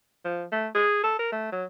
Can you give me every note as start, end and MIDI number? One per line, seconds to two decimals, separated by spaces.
0.25 0.45 53
0.52 0.68 57
0.75 0.99 68
1.04 1.18 69
1.19 1.31 70
1.32 1.51 57
1.52 1.65 54